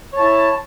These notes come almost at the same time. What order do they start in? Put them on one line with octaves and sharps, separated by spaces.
C#5 A5 E4